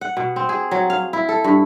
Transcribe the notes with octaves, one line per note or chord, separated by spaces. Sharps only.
F#5
B2
C4
G#4
F#3
F5
E4
A4
G2